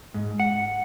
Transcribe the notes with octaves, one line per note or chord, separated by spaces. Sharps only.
G#2
F#5